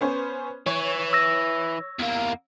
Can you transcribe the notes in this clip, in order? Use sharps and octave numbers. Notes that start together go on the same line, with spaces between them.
B3 C#4 C5
E3 C#5
E6 A#6
E2 A#3